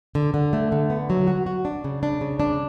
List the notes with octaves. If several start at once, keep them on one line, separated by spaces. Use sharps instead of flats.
D3
D3
A3
D3
B3
F#3
F#4
F#4
D4
C#3
D4
C#3
D4